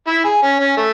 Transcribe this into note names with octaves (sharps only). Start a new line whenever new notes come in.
E4
G#4
C#4
C#4
A3